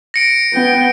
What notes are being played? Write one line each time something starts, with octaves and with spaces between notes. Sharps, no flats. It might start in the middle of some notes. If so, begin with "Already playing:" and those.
A#6 C#7 D7
B3 G5